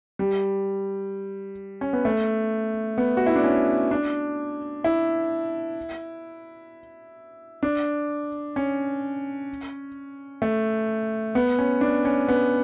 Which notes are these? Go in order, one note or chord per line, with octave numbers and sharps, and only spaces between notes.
G3
C#4
B3
A3
B3
F#4
E4
D4
C#4
D4
E4
D4
C#4
A3
B3
C#4
D4
C#4
B3